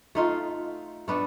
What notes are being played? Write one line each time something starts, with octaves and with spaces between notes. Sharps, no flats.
A3 D#4 F4
A3 B3 D4